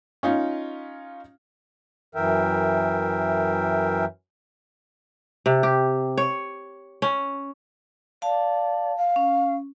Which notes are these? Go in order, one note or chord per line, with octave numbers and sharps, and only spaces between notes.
C#4 D#4 F4
F#2 E3 A#4 E5 G5
C3
G4
C#5
C#4
D5 F5 A5
F5
C#4